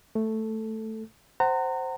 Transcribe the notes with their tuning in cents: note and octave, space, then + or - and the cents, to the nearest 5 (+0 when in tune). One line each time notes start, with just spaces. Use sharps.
A3 +0 A4 +0
C5 +0 F#5 +25 A#5 -30